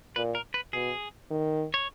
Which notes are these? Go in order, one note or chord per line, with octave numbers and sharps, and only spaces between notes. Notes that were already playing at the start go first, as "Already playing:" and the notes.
A#2 B4
A#4
B4
B2 G#4
D#3
C#5